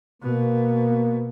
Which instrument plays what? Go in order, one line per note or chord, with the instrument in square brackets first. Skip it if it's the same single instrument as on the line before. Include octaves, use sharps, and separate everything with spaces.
[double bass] B2 [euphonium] A#3